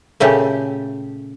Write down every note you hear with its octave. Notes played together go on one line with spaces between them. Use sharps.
A#2 C#3 A3 G4